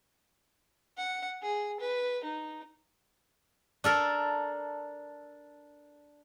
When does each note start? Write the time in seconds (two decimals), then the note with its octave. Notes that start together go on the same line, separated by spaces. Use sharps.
0.97 F#5
1.42 G#4
1.80 B4
2.24 D#4
3.84 D4 A4 A#4